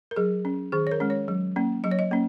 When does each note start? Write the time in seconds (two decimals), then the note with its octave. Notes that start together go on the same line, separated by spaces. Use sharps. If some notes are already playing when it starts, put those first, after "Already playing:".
0.11 A#4
0.16 F#3 G#4
0.45 C#4
0.72 D#3 G#4
0.87 C#5
0.91 A#4
1.00 G#3 C#4
1.10 C#5
1.28 F#3
1.56 A#3 C#4
1.84 F#3 D#5
1.91 C#5
1.99 D#5
2.11 A#3 C#4